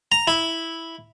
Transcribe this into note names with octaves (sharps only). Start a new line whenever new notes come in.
A#5
E4